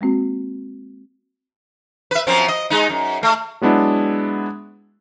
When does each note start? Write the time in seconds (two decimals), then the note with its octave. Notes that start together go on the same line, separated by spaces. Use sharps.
0.01 G#3 A#3 C4 F#4
2.11 B4 E5
2.27 F#2 F3 C4
2.48 D#5
2.70 G#3 D#4
2.90 F#2
3.23 A3
3.61 F#3 G#3 B3 D4 E4